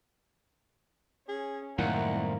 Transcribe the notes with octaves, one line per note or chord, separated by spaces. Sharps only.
C#4 G#4
C2 F#2 A2 D#3 A#3 F#5